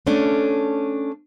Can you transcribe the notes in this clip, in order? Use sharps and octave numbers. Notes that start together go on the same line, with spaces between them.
A3 C#4 D4